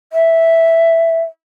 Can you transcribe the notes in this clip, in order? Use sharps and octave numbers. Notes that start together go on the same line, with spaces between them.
E5